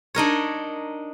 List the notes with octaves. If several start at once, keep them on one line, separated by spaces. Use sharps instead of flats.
D4 D#4 A#4 C#5